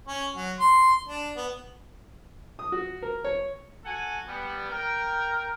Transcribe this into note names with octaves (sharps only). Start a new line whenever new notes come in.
C#4
F#3
C6
D4
B3
D#6
F#4
A#4
C#5
F#4 A4 F#5 G#5
G3 B3
A#4 G5